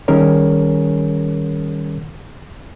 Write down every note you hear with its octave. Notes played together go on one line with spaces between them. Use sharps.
D#3 G3 C#4 G#4 A#4 C#5